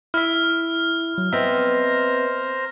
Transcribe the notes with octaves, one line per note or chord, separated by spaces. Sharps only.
E4 E5 F6
F#3
B3 C4 C5 D#5 E5 A#5